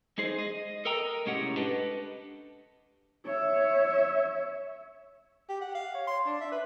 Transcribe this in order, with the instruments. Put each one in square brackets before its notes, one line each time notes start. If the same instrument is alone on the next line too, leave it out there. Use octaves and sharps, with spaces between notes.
[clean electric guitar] G#3 D#4 G#4 C5 D#5
D#5
A4 A#4 D#5 G5 A#5
C2 A2 G#3 C#4 G4 F#5
D4 G4 A4 B4 D#5
[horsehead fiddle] C#5 E5
[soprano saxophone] G4
F#5
F5
C#5
C6
D4
E5
B4